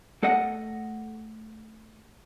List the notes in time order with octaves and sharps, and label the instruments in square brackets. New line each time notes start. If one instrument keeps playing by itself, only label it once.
[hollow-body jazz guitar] A3 A4 D5 D#5 F#5